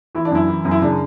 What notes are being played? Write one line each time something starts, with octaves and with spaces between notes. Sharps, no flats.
E3 E4
D4
F#2 E4
E3
F#2
E4
C#3 D4